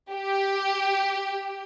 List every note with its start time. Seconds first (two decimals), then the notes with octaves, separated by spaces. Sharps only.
0.12 G4